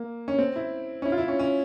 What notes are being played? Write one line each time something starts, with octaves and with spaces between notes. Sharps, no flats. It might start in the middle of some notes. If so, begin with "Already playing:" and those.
Already playing: A#3
C#4
C4
E4
C#4
E4
F4
E4
C#4
C#4